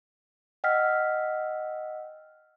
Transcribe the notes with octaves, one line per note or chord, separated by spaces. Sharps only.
D#5 F#5 G5 E6 F6 B6